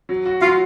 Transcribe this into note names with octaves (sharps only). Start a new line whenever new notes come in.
F#3
F#4
F#3 F4 F5